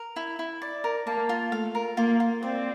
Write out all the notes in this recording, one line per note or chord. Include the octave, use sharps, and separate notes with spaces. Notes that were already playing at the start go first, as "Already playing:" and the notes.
Already playing: A#4
E4
E4
D5
A#4
A#3 A5
F4
A3 F5
A#4
A#3 F4
F4
C4 D5